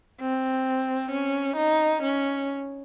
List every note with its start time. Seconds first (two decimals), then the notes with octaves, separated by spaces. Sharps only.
0.21 C4
1.11 C#4
1.57 D#4
2.03 C#4